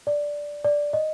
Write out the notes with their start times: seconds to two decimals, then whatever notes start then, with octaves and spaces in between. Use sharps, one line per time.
0.07 D5
0.64 D5
0.93 D#5